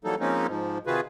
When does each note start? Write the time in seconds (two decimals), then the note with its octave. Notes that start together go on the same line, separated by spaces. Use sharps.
0.04 E3 F#3 G3 A#3 D#4 A4
0.20 F3 G#3 A#3 C4 C#4 D#4
0.48 G#2 F3
0.87 C3 D#3 F4 F#4 G#4 B4